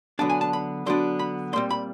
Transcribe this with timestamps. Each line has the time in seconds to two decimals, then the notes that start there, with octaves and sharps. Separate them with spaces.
0.19 D3 F#3 B3 D4 A5
0.30 G#5
0.41 A5
0.53 B5
0.86 D3 F#3 B3 D4 C6
1.19 B5
1.53 A#2 G3 C4 C6
1.70 B5